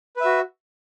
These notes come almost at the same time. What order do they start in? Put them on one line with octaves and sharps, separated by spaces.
B4 E5 F#4